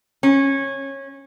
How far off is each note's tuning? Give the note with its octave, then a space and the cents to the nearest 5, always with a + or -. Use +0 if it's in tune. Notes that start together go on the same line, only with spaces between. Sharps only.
C#4 -20